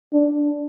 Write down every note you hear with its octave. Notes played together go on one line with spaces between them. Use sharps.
D4